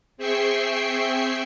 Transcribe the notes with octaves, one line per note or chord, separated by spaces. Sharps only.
C4 G#4 E5 G5 C#6 C7